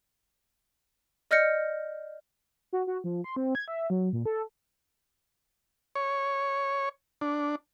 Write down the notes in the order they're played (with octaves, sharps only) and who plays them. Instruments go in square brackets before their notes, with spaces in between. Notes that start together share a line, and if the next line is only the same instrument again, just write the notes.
[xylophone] D5 D#5 F6 G6 A#6 C#7
[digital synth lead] F#4
F#4
F3
C6
C4
G#6
E5
F#3
A#2
A4
[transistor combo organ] C#5
D4